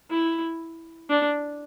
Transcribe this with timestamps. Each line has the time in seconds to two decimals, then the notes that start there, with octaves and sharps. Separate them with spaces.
0.10 E4
1.09 D4